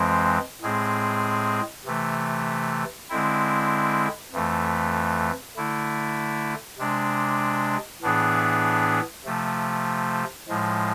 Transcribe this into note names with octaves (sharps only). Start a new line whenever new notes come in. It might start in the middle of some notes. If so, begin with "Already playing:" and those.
Already playing: F2 E3 G#3 C4
A2 G#3 C4 G#4
C3 E3 A3
D3 G#3 C4 E4
F2 E3 A3
D3 A3 E4
C3 G#3 D4
A2 E3 B3 D4 G#4
C3 F3 A3
A2 F3 G#3